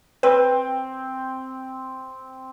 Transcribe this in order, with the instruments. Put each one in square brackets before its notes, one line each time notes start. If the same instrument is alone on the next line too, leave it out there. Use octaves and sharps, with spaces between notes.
[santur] C4 [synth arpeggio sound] B4